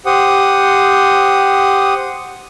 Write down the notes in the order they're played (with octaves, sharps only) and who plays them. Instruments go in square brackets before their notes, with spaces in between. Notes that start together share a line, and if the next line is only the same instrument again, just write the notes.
[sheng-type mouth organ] G4 C5 F#5 D#6